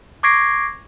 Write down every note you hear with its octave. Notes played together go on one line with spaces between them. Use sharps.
C#6 D6 G#6 A#6 C7 D7